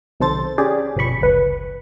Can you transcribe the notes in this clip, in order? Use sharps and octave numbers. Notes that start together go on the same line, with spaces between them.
B1 C3 D#3 A4 C5 A6
C#4 G4 G#4 D5
G1 B2 F3 C#4 B5 C#6
G1 C#2 B4